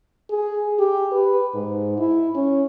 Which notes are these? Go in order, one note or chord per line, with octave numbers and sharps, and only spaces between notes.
G#4
G4
B4
G#2
E4
C#4